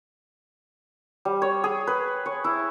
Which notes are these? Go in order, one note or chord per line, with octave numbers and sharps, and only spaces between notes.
G3
C#5
G#4
B4
C#5
E4